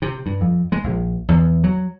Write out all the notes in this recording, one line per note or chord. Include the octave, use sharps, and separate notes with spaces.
C3
G2
F2
G#3
A#1
E2
F#3